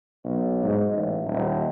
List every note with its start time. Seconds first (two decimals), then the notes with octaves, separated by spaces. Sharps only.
0.24 B1
0.63 G#2
0.94 A1
1.26 D#1